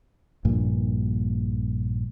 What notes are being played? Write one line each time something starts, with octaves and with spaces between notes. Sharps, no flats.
A#1 G2 A#2 A#3